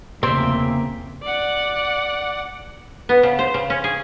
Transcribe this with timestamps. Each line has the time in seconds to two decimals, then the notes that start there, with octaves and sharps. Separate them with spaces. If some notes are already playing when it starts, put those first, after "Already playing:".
0.23 F1 E2 C#3 A#3 C4 E5
1.23 D5 F#5
3.09 B3
3.23 C#3
3.39 C5
3.54 C#3
3.70 C#4
3.84 G#4